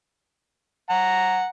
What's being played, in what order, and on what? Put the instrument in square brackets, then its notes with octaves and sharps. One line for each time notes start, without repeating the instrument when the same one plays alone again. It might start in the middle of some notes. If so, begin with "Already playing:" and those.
[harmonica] F#5 A#5